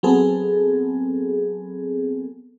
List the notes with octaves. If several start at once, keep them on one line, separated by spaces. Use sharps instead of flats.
F#3 B3 C4 G#4 A4